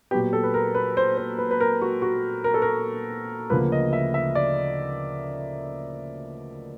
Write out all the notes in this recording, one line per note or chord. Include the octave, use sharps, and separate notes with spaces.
A#2 F#3 B3 G4
A4
B4
A#4
B4
C5
C5
B4
B4
A#4
F#4
F#4
A#4
A4
A#4
D2 C#3 F3 A#3 B4
D#5
E5
E5
D5